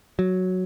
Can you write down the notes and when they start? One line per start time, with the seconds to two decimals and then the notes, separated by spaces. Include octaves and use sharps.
0.19 F#3